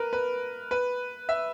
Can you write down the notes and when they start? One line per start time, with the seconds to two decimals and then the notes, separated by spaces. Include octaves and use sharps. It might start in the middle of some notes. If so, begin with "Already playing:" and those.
Already playing: A#4 B4
0.13 B4
0.71 B4
1.29 E5